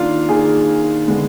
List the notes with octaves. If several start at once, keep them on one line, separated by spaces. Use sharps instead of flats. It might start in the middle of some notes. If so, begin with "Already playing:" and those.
Already playing: D#3 A#3 D4 F4 F5
D#3 A#3 G#4 G#5
D3 G#3 B3